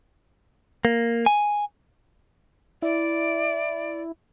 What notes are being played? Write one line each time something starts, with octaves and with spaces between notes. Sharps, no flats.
A#3
G#5
E4 D5